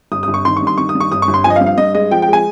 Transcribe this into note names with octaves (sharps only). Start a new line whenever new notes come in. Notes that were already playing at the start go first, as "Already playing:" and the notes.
G1 D#6
D#6
G1
C#6
D#3 C6
C#6
G2 C6
D#3 C#6
D#6
G2
C#6
G1 D#6
C#6
G1
C6
F3 G#5
D#5
F5
G2
F5
G2 D#5
G#3 D#5
F3 G5
G5
G#3 G#5